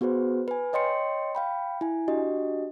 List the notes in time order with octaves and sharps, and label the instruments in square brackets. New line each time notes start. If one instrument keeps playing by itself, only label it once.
[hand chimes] B3 F#4 G#4 B4 C5
B4 G#5
C#5 D#5 G5 C6 C#7
F5 G5 B5
E4 G#5
D4 F#4 G4 D#5